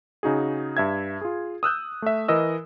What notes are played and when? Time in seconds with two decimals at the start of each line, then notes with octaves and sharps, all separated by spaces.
0.23 C#3 D#4 F#4 G#4
0.77 G2 E5 G#6
1.21 F4 G#4
1.63 D#6 E6 F#6 G6
2.02 A3 E5
2.28 E3 A#4 D#5 E6